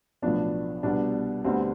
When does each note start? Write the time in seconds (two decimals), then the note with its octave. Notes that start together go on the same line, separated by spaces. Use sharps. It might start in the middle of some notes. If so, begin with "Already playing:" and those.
0.22 B1 A2 F3 B3 D4
0.83 C2 B2 B3 D4
1.44 D2 D3 G3 B3 C4